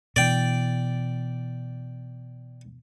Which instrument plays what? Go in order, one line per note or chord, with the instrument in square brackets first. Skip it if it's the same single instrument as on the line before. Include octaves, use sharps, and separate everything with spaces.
[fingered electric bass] B2 E3 [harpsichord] D5 G5